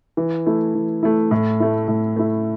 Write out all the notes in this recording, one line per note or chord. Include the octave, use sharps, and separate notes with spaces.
E3
A3 E4
E3
A3 E4
A2
A3 E4
A2
A3 E4